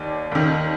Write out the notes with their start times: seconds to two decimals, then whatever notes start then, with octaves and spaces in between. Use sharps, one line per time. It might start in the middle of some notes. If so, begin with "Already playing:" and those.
Already playing: D#2 D#3 D5
0.32 D#2 D#3